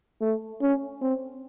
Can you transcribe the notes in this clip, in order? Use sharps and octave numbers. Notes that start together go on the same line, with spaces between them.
A3
C#4
C4